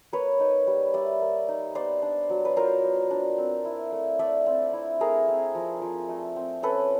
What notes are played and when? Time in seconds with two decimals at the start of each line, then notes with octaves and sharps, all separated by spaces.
0.13 A#3 B4 C#5
0.40 D#4
0.67 G3
0.94 G3 D5 E5
1.21 A#3
1.48 D#4
1.75 B3 C5 D5
2.02 D4
2.30 F#3
2.45 B4
2.56 F4 A#4 C5
2.84 B3
3.11 D4
3.38 C4
3.65 E4
3.92 A3
4.19 A3 D5 E5
4.46 C4
4.73 E4
5.01 A3 G#4 A#4
5.28 C4
5.55 F3
5.82 F3
6.09 A3
6.36 C4
6.63 C#4 A4 B4